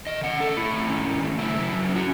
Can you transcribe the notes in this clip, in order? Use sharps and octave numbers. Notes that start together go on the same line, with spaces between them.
D#3 D#5
C#4 F#5
A3 A4
A3 E4
D#3
C#4
D#3
A3
C#3 E4
F#3
F#3
C#4
F#4